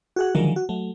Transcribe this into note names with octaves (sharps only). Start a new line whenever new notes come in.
F#4 G#4 F#5
D3 D#3 F3 F#3 G#3 A#4
F#4
F#3 A3